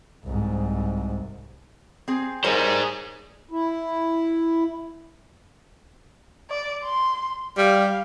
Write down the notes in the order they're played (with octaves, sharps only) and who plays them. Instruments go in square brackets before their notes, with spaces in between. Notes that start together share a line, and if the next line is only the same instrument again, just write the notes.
[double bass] C2 G#2
[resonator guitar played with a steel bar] C4 G#4
[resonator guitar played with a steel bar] G3 A#4 C#5 [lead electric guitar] G#4 C5
[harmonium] E4
[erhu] D5
C6
[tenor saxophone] G3 [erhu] F5